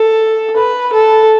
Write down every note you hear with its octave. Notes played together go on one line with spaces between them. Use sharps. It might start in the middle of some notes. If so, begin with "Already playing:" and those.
Already playing: A4
B4
A4